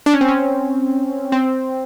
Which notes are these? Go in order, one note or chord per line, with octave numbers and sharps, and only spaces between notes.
D4
C#4
C4
C#4
C4